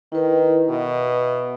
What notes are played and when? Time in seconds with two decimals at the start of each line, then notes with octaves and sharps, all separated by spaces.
0.12 D#3 E4 B4
0.69 B2 E5